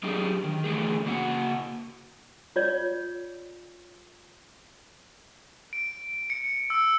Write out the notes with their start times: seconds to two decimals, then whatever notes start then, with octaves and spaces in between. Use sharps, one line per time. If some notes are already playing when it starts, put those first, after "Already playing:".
0.03 F#3 D4 F4 G4 G#4
0.44 D#3
0.64 D3 E3 A3 G#4
1.05 C#3 A#3 F#4 F#5
2.56 F4 C#5 D5
5.73 D7
6.30 C#7
6.70 E6